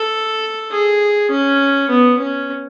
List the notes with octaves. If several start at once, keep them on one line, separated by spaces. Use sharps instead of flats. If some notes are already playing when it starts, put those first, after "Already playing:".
Already playing: A4
G#4
C#4
B3
C#4